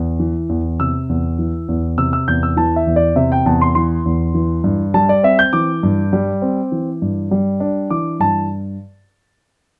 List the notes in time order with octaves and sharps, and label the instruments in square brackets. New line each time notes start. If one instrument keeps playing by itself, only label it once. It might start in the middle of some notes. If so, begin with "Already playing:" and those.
Already playing: [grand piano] E2
E3
E2
C3 E6
E2
E3
E2
C3 E6
E6
E2 G6
E6
E3 A5
E5
E2
D5
C3 E5
G5
E2 A5
C6
E3 C6
E2
E3
G2
G3 A5
D5
C4 E5
G6
E3 D6
G2
G3
C4
E3
G2
G3
D4
E3 D6
G2 A5